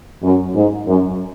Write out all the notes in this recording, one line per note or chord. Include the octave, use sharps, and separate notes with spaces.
F#2
G#2
F#2